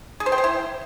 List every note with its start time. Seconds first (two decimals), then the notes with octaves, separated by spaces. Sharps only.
0.20 G#4
0.26 C5
0.32 G5
0.38 C5
0.44 E4